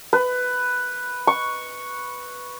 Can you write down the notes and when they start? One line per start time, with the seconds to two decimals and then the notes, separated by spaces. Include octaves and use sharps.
0.13 B4
1.27 C#6